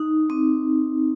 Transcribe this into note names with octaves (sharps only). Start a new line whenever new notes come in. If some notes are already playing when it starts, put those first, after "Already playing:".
Already playing: D#4
C4